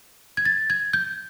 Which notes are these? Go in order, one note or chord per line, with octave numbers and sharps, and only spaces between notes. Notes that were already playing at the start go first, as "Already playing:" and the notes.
G#6
A6
G#6
G6